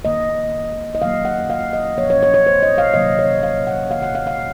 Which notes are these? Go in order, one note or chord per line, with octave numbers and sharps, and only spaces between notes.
D#3 A#3 D#5
D#5
D#3 F#3 A#3 F5
F#5
F5
D#5
A#2 F3 A#3 C#5
C#5
C#5
C#5
C5
D#5
F5
C3 D#3 F#3 A#3 D#5
C#5
F5
F#5
D#3 F#3 A#3 F5
F#5
F5
F5